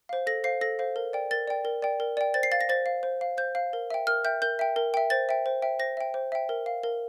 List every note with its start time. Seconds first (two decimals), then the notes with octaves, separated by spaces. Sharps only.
0.09 C5 F5
0.27 A4 A#6
0.44 C5 F5 C7
0.61 A4 A#6
0.79 C5 F5
0.96 A#4
1.13 D5 G5
1.31 A#4 A6
1.48 D5 G5
1.65 A#4
1.82 D5 G5
2.00 A#4
2.17 D5 G5
2.34 C5 A6
2.43 C7
2.52 F5 A6
2.61 A#6
2.69 C5 A6
2.86 F5
3.03 C5
3.21 F5
3.38 C5 G6
3.55 F5
3.73 A#4
3.90 E5 G5
4.07 A#4 F6
4.24 E5 G5 G6
4.42 A#4 G6
4.59 E5 G5
4.76 A#4
4.94 E5 G5
5.10 C5 A6
5.29 E5 G5
5.46 C5
5.62 E5 G5
5.79 C5 A#6
5.97 E5 G5
6.14 C5
6.32 E5 G5
6.49 A#4
6.66 F5
6.83 A#4